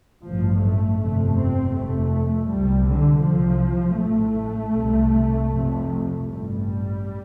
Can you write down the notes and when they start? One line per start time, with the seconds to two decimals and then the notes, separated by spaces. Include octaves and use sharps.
0.25 A1 G2 F3
0.62 A3
1.00 G1 F2 C3 A3
1.38 C4
1.75 F1 F2 C3 A3
2.50 C2 C3 G3
2.86 D3
3.24 C2 C3 F3
3.99 A1 A2 A3
4.74 C2 C3
5.50 F1 F2 C3
6.25 A1 G2 G3